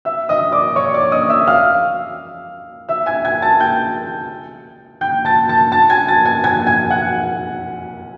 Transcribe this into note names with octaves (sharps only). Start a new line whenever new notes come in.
E5 E6
D#5 D#6
D5 D6
C#5 C#6
D5 D6
D#5 D#6
E5 E6
F5 F6
E5 E6
G#5 G#6
G#5 G#6
A5 A6
G5 G6
G5 G6
A5 A6
A5 A6
A5 A6
G#5 G#6
A5 A6
G#5 G#6
G#5 G#6
G#5 G#6
F#5 F#6